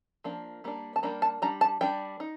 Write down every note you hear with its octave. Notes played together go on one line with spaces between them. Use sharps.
F3 A#3 D4
G3 A#3 D4
A5
G3 A#3 D4 A#5
A5
G3 D4 A#5
A5
G3 D4 G5
D#4